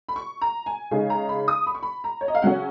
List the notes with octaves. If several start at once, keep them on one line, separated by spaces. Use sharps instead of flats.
B5
C#6
A#5
G#5
C#3 G#3 D#4 G#5
A#5
B5
D#6
B5
C#6
B5
A#5
C#5
D#5
F5
C#3 F#3 C#4 F#5